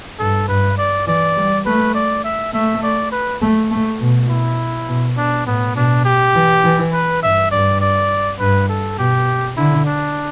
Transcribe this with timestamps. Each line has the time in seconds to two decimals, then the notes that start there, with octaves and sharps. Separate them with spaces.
0.19 G2 A4
0.49 G2 B4
0.78 D5
1.07 E3 D5
1.37 G3
1.66 A3 B4
1.95 D5
2.25 E5
2.54 A3 E5
2.83 D5
3.12 B4
3.42 A3
3.71 A3
4.00 B2
4.30 E4
4.89 B2
5.17 B2 D4
5.46 A2 B3
5.76 B2 D4
6.05 G4
6.35 E3
6.64 E3
6.93 B4
7.23 G2 E5
7.51 G2 D5
7.81 D5
8.39 G2 B4
8.69 A4
8.98 B2 G4
9.57 D3 E4
9.85 D4